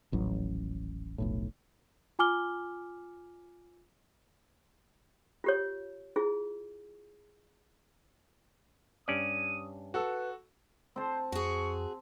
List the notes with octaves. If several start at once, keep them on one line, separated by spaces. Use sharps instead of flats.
D#1 A1 F#3
F1 B1 A2
F4 G#5 D6 F6 G7
F4 G4 C#5
E4 F4 G#4
G2 C#4 D5 D#6
F#4 A4 B4 E6
C4 C5 A5
F2 F#4 G#4 C#6